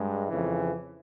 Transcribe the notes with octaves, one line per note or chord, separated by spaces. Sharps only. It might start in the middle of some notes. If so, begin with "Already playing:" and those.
Already playing: G2 G#3
F2 C#3 E3